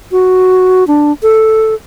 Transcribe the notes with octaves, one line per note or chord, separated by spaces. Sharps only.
F#4
D4
A4